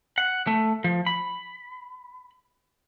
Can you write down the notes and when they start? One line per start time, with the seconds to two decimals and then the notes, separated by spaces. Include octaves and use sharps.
0.18 F#5
0.47 A3
0.84 F3
1.06 B5